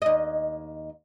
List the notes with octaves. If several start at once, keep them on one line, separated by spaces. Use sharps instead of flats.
D#2 D#5